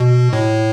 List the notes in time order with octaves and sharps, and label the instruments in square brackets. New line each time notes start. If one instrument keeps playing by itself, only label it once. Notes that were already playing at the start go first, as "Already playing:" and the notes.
Already playing: [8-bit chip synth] B2
A2